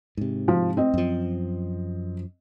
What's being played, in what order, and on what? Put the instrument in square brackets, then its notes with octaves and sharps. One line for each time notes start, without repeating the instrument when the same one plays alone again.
[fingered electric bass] G#2 C3
[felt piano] F3
C4 D#5
[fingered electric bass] F#2 F3